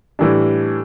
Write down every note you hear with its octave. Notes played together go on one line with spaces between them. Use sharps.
A2 E3 G3 D4